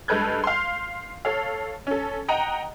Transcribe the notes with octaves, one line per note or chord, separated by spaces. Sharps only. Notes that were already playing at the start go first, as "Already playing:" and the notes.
G2 G#3 A4 B4 G6 G#6
F5 C6
A4 C#5 F5
C#4 A4
D#5 F#5 G5 A#5